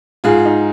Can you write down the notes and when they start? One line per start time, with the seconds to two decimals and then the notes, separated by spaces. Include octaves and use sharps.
0.24 G#2 F4 G#4
0.45 D#4